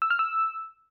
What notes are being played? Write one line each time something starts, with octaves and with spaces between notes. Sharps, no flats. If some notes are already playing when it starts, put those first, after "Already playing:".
E6
F6
E6